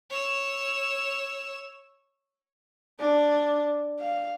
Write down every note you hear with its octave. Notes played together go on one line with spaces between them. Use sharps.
C#5 E6
D4
F5